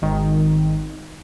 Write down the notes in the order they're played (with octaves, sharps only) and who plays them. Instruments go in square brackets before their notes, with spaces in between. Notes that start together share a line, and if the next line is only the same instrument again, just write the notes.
[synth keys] G#1 D#3